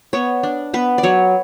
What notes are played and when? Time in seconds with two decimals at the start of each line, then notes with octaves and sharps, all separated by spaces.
0.13 B3 C#5
0.43 D4
0.74 B3 B4
0.98 D5
1.03 F#3 C#5